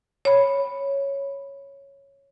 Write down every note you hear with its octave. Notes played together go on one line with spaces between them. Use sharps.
C#5 B5